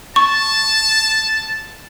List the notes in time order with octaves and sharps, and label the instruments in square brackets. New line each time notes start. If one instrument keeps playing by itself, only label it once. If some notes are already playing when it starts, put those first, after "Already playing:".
[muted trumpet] A5 [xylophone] C#6